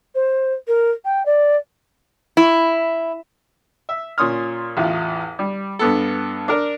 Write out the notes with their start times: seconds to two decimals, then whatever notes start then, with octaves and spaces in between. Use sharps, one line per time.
0.15 C5
0.67 A#4
1.05 G5
1.25 D5
2.37 E4
3.89 E5
4.18 A#2 C#4 C6 D#6 F6
4.77 A1 E2 F4
5.39 G3
5.79 G2 B3 A4
6.48 D4 A#4